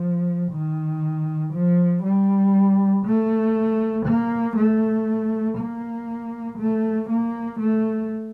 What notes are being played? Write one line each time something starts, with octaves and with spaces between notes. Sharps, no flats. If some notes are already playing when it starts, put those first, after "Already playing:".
Already playing: F3
D#3
F3
G3
A3
A#3
A3
A#3
A3
A#3
A3